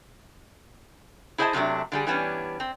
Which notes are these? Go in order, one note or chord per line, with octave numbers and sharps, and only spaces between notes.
E4 G#4 C5 D#5 F#5 A5
F#2 C3 F#3 A3 D4
D3 G3 G#4
E3 G3 B3 C#4 D4
C4